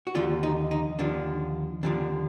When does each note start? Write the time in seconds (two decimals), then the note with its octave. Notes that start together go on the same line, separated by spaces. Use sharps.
0.07 F#4
0.15 D#2 D3 F3 F4
0.43 D#4
0.71 D#4
0.99 D#2 D3 F3 D4
1.83 D#2 D3 F3 D4